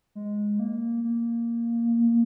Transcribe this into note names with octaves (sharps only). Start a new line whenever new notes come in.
G#3
A#3
A#3